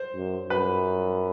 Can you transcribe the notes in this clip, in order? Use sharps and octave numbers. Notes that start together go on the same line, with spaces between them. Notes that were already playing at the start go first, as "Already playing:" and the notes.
Already playing: C5
F#2
F#2 B4